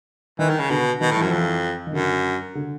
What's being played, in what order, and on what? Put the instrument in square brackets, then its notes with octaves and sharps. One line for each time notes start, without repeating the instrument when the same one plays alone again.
[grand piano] D#3 [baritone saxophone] E3
[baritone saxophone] D#3
C#3
[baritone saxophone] B2 [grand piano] D3
[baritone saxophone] B2 [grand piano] D#3
[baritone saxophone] A2
[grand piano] E3
[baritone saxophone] F#2
[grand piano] F3
[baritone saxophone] F2 [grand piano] E3
[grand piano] D#3
[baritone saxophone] F#2 [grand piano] D3
[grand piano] D3